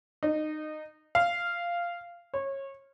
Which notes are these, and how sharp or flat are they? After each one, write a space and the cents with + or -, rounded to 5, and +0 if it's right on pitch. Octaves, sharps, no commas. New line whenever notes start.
D#4 -20
F5 -10
C#5 -25